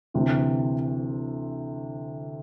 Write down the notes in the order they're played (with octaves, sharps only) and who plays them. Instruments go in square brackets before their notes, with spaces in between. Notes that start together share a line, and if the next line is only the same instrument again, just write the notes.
[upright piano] D2 C3 E3